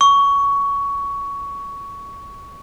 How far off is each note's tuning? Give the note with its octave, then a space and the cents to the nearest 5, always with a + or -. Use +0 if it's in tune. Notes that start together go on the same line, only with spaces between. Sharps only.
C#6 +15